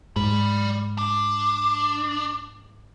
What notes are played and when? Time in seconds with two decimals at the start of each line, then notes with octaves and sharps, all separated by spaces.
0.16 G#2 D5 B5
0.98 D4